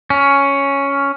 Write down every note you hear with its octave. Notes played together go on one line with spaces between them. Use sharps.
C#4